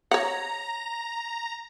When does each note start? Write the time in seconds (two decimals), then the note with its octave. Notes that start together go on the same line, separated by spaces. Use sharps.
0.11 C#5 F#5 A#5